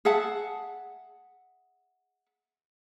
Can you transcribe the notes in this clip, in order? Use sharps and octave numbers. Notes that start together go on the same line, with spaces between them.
G#4 E5 F#5 A5